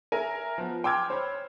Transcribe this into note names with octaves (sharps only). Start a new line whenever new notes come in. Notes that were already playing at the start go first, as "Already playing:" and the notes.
A#4 E5 G#5
F3 B3
G5 C6 D6 E6 F6 G#6
C5 C#5 B5